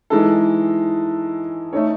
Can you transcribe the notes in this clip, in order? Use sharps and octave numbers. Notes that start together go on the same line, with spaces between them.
E3 G#3 D#4 A4
A3 D#4 A4 C#5